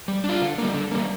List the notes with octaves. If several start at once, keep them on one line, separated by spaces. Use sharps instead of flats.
G3
D4
F4
D3
G3 A#3
D3
G3 A#3